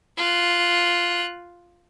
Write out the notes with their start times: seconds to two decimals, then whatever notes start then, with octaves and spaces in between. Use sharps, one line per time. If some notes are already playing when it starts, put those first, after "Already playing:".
0.17 F4 F#6